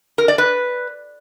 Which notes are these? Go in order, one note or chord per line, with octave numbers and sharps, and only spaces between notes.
A#4
D5
B4